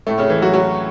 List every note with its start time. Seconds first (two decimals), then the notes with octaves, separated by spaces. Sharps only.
0.07 A2 A3
0.18 C#3 C#4
0.30 E3 E4
0.42 F#3 F#4
0.53 F#3 F#4